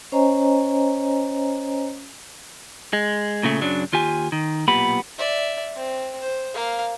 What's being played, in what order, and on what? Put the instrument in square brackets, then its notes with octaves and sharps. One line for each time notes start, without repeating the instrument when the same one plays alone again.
[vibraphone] C#4 C5 C#5 D#5 G#5 A#5
[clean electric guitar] G#3
A#2 C#3 A3
F#2 C#3 F#3 D4
D#2 F4 G4 G#5
D#3
B1 A#2 B3 G4 B5
[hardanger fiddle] D5 E5
C4
C5
A#3 F5